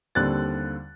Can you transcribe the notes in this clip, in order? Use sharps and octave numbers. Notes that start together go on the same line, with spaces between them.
D#2 D3 G3 C4 F#6 A6